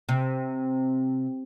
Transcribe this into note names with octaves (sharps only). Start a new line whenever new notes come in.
C3